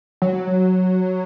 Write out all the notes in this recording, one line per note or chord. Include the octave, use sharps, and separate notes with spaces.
F#3